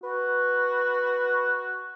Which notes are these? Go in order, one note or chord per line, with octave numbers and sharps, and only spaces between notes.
F#4 B4